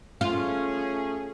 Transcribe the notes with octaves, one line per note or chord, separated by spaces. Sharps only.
A3 C#4 F4 G#4